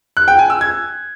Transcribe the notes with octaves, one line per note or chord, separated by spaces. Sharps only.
F#6
G5
G#5
E6
G#6